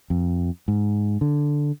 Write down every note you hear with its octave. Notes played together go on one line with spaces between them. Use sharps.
F2
G#2
D3